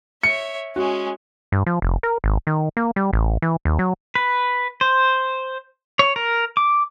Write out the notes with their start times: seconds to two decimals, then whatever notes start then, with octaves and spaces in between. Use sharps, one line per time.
0.23 C#5 E5 C#7
0.76 G#3 C#4 F#4
1.52 G2
1.66 F3
1.82 F1
2.03 A#4
2.24 G#1
2.47 D#3
2.77 A#3
2.96 G3
3.13 A1
3.42 E3
3.65 D#2
3.79 F#3
4.15 B4
4.81 C5
5.99 C#5
6.16 A#4
6.57 D6